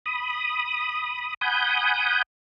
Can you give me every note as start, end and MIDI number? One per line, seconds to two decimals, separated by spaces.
0.06 1.34 83
0.06 1.34 87
1.41 2.22 78
1.41 2.22 80
1.41 2.22 83
1.41 2.22 87
1.41 2.22 91